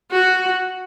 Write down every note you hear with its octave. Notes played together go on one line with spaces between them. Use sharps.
F#4